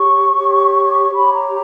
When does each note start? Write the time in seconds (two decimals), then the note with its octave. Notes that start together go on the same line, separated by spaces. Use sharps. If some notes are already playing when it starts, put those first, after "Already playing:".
Already playing: G4 C#5 C#6
0.33 G4 C#5
1.13 G4 C#5 B5
1.33 A#5